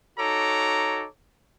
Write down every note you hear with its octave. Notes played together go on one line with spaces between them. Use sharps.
D#4 F#4 A4 C#5 A#5 D6